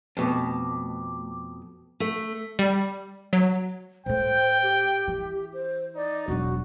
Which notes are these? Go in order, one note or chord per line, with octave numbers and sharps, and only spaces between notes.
F2 B2 A3 D6
A3
G3
F#3
A2 A3 C5 G5
G4
E3
C5
D#4 D5
E1 F#3 F#4